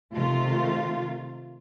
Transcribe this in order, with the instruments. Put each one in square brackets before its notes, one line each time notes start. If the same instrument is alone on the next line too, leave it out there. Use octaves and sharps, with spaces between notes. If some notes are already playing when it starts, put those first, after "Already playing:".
[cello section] C3 D#3 A3 F4